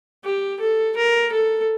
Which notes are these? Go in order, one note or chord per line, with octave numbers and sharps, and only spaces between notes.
G4
A4
A#4
A4